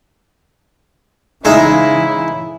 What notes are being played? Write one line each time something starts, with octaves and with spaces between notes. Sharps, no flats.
C#3 E3 G#3 D#4 E4 E5 F5